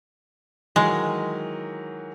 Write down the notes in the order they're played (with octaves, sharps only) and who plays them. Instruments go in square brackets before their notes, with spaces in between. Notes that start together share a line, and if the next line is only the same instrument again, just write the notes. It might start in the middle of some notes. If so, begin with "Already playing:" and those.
[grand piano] D#3 E3 F#3 [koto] G#3